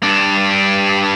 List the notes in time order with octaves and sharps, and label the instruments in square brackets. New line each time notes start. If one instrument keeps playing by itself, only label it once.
[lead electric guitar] G2 D4